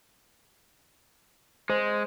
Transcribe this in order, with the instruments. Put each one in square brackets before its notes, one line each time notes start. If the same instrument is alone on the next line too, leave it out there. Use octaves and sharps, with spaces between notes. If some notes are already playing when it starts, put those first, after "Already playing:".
[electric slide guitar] G#3 [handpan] C5